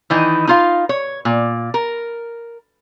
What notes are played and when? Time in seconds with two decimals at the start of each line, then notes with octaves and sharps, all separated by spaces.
0.10 D#3 E3 D#4
0.47 D#4 F4 F5
0.89 C#5
1.25 A#2
1.74 A#4